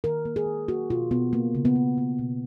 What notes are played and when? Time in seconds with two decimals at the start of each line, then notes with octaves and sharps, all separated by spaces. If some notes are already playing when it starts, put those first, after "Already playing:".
0.04 D#3 A#4
0.25 A#3
0.36 G#4
0.46 D#3
0.68 A#3 F#4
0.90 B2 F4
1.11 B2 B3
1.33 C#3 A#3
1.55 C#3
1.65 B3
1.76 A#3
1.98 A#3
2.19 B2